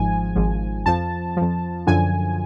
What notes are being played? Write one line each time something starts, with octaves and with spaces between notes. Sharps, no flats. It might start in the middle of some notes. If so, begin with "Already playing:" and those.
Already playing: G#1 G#2 F3 G#5
G#1 G#2 F3
F2 F3 A5
F2 F3
F#2 D3 F3 G#5